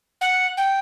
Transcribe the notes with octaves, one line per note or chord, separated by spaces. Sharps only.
F#5
G5